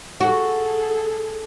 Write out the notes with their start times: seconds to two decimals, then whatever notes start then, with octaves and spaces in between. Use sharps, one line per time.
0.20 F#4 G#4 A4